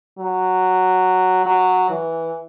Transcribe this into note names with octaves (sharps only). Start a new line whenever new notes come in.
F#3
F#3
E3